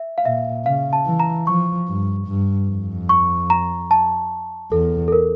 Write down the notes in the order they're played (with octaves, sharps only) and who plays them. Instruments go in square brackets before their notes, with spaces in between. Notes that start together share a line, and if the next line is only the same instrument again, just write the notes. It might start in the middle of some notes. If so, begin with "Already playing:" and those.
Already playing: [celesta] E5
F5
[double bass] A#2 [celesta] E5
[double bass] C#3 [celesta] F5
[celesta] A5
[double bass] E3
[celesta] A#5
[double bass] F3 [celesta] C#6
[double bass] G2
G2
F2
[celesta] C#6
A#5
A5
[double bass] E2 [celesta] A4
[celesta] A4
A#4